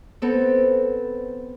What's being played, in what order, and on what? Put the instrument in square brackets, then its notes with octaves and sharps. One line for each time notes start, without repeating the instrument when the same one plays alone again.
[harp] B3 C4 A4